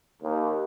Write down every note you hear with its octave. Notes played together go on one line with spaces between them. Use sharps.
D#2